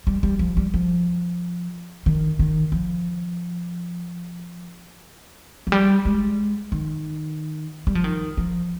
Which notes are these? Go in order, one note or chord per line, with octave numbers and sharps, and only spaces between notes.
G3
G3
F3
G3
F3
D#3
D#3
F3
F3
G3
G#3
D#3
G3
F3
D#3
F3